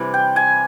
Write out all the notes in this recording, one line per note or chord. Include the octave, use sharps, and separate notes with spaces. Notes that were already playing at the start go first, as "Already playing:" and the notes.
Already playing: C3 E3 G3
G5
G#5